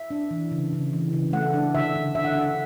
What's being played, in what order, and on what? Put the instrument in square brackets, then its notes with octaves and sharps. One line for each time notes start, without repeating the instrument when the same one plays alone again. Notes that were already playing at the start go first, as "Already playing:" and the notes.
Already playing: [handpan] E5
D4
E3
C#3
C#3
E3
C#3
A3 F#5
D4
D3 E5
D3
D3 E5
F#5
D4 E5